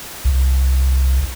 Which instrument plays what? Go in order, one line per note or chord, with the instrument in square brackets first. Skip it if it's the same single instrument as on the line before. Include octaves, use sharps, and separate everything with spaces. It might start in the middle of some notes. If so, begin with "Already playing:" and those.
[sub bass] C2